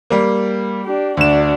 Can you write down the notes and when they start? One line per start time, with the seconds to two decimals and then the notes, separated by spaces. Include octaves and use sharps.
0.10 G3 A#3
0.83 D4 G4
1.17 D2 D4 F#4 E7